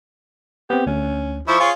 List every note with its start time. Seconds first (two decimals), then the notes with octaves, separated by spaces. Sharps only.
0.70 B3 C4 G4
0.86 D2 C#4
1.48 F3 E4 C5 C#6
1.60 F4 G#4 C#5